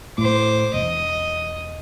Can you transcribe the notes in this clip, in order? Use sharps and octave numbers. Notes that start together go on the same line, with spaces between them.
A2 C5 D6
E1 D#5